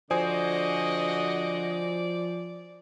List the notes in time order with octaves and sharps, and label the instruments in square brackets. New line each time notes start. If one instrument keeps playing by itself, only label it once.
[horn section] D3 F#4 D#5 [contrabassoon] F3 [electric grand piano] C5 G#5 D#6 [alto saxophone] D5